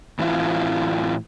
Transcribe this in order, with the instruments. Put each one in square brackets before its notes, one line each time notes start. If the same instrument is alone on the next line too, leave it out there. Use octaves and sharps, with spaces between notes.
[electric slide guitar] A2 E3 C4 E4 F4